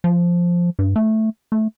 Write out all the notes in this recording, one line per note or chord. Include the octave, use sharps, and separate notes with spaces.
F3
G2
A3
A3